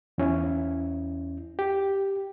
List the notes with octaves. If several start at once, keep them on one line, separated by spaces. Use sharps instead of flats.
E2 C#4 E4
G4